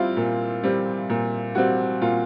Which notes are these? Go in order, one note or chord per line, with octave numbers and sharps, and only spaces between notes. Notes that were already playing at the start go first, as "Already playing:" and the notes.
Already playing: G3 C4 E4 F4
A#2
G3 C4
A#2
G3 C4 F#4
A#2 F4